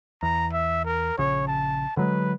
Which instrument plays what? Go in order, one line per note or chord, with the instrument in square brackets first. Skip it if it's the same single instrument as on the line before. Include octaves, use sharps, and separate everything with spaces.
[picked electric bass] E2 [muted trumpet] A#5
[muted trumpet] E5
A#4
[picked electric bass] A#1 C#3 [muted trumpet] C#5
[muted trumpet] A5
[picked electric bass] D3 F#3 G#3 [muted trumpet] B4